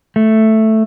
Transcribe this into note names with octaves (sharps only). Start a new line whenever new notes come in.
A3